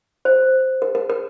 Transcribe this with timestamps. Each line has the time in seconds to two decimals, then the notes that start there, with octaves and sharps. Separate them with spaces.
0.25 C5
0.82 A#4
0.95 A#4
1.10 A#4